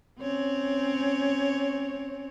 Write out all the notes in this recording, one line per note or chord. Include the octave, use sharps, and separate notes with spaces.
C4 C#4 C#5